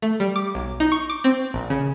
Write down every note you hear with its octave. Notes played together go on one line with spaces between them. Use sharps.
A3
G3
D6
B1
D#4
C#6
D6
C4
A#1
C#3